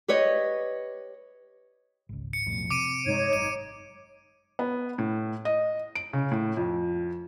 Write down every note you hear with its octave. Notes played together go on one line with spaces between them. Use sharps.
G4 B4 C#5 D#5
G#1 C#2
C#7
B1 F2 A2
C3 D6 D7 D#7
G2 C3 G#3 D#4 C#5 G#6
G#1 F#2 D#7
B3
A2
D#5
D7
C#3
A2
F2